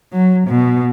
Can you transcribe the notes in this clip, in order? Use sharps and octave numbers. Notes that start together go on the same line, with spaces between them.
F#3
B2